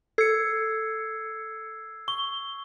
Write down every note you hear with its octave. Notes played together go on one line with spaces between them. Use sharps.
A4 E6 G#6 C7 C#7
C#6 G7